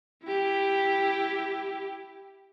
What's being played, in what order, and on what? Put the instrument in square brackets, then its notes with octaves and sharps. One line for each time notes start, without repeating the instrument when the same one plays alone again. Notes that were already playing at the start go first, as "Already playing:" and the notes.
[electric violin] E4 G4